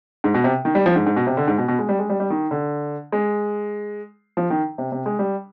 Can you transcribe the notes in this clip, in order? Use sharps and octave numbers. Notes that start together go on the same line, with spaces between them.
G#2
B2
C3
D#3
G3
F3
G#2
G#2
B2
C3
D3
G#2
B2
B2
G#3
G3
G#3
G3
G3
D#3
D3
G#3
F3
D#3
C3
C3
G#3
G3